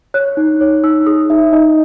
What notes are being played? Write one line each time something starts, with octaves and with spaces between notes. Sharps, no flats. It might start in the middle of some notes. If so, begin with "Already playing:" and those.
C#5 F#6
D#4
C#5
D#4 E6
G#4 D#6
D#4 E5
D#4 D#5